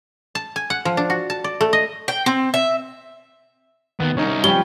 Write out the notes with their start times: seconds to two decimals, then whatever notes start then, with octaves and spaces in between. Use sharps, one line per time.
0.35 A5
0.56 G#5
0.70 F#5
0.85 F3
0.97 D4
1.10 F#4
1.30 A5
1.44 D5
1.61 A3
1.73 D#5
2.08 G5
2.26 C4
2.54 E5
4.00 D#2 B3
4.17 C2 C#4 D#4
4.44 F3 G3 C#4 G7